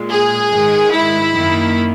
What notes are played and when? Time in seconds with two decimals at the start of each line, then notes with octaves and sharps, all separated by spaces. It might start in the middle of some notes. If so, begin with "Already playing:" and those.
Already playing: A#2 G#3
0.10 G#4
0.51 G#2 D#3 G#3
0.92 E4
1.33 F#2 D#3 A#3